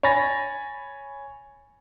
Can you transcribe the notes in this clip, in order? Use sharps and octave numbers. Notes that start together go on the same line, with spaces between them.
C#5 G#5 B5 A6 A#6